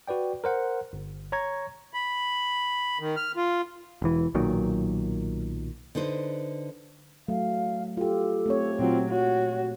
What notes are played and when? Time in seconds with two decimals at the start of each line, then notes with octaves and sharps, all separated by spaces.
0.08 F#4 B4 D5 G5
0.44 A#4 C5 F#5
0.93 G1
1.32 C#5 A#5 C#6 G#6
1.94 B5
3.00 D#3
3.16 F6
3.37 F4
4.02 E1 E3
4.35 B1 A#2 D#3 F#3
5.95 D3 D#4 B4 C5
7.28 F#3 A3 F5
7.97 F4 G4 A4
8.46 A3 C4 C#5
8.79 A#2 F#3 C4 F4
9.09 F#4 C#5